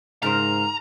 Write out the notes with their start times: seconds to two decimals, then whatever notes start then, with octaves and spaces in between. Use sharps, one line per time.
0.23 G#2 C#3 A#4 C5 A#5